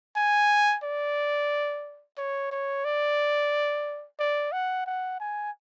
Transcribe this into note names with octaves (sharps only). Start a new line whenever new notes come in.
G#5
D5
C#5
C#5
D5
D5
F#5
F#5
G#5